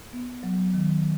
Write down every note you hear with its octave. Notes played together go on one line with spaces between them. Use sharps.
B3
F#3
D#3